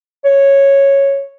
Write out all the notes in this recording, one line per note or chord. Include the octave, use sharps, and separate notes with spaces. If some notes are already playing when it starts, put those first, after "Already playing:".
C#5